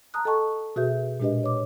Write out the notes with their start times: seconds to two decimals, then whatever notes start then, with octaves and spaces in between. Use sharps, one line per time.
0.14 A5 A#5 D#6 F#6
0.25 A4 D#5 G5 A5 C#6
0.76 B2 F#4 G#4 B4 E5 G6
1.20 A#2 G#3 D4 G4 B4 D#5
1.43 C#5 D6